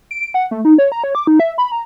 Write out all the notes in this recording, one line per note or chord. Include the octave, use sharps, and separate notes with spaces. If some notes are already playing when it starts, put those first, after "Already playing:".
D7
F#5
A3
D#4
C#5
A#5
C#5
D6
D#4
E5
B5
A#5